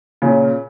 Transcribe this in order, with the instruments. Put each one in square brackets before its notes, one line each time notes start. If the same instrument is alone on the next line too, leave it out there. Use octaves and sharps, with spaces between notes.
[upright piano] A#2 C#3